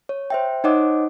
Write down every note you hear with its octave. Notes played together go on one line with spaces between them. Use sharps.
C#5
C5 E5 G5
D#4 C5 C#5 D#5 F#5 D6